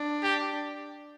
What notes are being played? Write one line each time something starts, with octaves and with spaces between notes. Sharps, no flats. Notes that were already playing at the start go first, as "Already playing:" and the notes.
Already playing: D4
G4